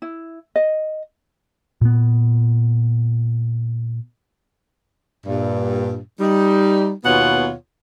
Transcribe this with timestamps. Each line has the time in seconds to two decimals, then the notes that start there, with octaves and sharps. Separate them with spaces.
0.02 E4
0.56 D#5
1.81 A#2 B3
5.25 G2 A#2
6.19 G3 D#4
7.03 D#2 B2 B3 F4 C#5 F#5